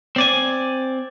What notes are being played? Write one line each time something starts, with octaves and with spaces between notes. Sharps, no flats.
C4 D5 G#5